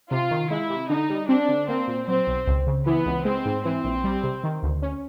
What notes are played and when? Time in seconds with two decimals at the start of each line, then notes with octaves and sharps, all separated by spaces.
0.11 C3 F4
0.31 D#3
0.50 G#3 E4
0.70 C3
0.90 D3 D#4
1.10 G3
1.29 C4 D4
1.49 D3
1.68 A#3 C4
1.88 A#2
2.08 F#3 C4
2.27 B1
2.47 C#2
2.67 C#3
2.86 E3 B3
3.06 C#2
3.25 G#3 C4
3.45 G#2
3.64 E3 C4
3.84 A#1
4.04 G3
4.23 C3
4.44 D#3
4.63 D2
4.82 C#4